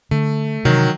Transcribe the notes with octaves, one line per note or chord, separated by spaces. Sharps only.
D3 A3
C3 D#3 E3 F#3